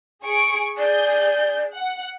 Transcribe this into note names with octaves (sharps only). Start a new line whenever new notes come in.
G#4 C#6 D7
G#4 D5 G6
F#5